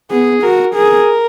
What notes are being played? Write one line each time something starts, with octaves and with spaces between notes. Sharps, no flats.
B3 G#4
F#4 A#4
G#4 A#4